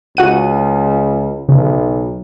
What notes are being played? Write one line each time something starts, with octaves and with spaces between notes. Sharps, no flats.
C#2 F#4 F#5 D#7
B1 C#3